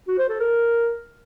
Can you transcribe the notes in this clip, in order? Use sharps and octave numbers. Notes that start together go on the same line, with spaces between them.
F#4
C5
A4
A#4